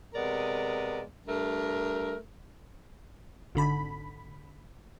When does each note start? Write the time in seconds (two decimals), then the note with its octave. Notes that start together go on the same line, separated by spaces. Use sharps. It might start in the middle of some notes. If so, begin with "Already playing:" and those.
0.14 C3 G#3 B3 A#4 D5
1.27 G2 A3 A#4
3.55 G#1 D3 B5